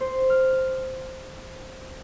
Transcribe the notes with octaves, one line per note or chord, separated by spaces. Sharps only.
C5
F6